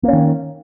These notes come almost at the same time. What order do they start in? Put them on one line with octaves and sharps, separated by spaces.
A#3 C#4 D#3